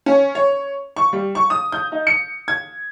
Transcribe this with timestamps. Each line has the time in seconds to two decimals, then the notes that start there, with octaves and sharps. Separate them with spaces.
0.06 C#4
0.35 C#5
0.97 C#6
1.13 G3
1.35 C#6
1.50 D#6
1.72 G6
1.92 D#4
2.07 C#7
2.48 G#6